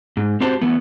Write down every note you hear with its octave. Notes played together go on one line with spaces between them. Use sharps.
G#2
C4 F#4 G4 C5 A5
E3 A3 B3